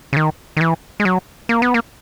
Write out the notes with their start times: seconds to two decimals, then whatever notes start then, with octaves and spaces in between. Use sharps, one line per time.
0.13 C#3
0.17 D#3
0.57 D#3
0.61 E3
1.00 G#3
1.05 F#3
1.49 A#3
1.62 B3
1.74 A#3